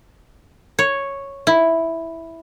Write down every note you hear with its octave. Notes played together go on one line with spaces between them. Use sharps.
C#5
E4